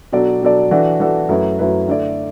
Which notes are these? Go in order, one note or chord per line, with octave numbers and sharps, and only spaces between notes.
B2 F#3 D4 A4 D5
B2 F#3 D4 A4 D5
E3 D4 F#4 A4
E3 D4 F#4 A4
F#2 F#3 A3 E4 B4
F#2 F#3 A3 E4 B4
D3 A3 E4 D5